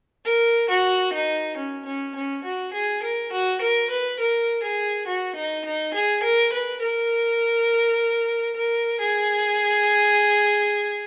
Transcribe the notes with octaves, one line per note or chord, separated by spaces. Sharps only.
A#4
F#4
D#4
C#4
C#4
C#4
F#4
G#4
A#4
F#4
A#4
B4
A#4
G#4
F#4
D#4
D#4
G#4
A#4
B4
A#4
A#4
G#4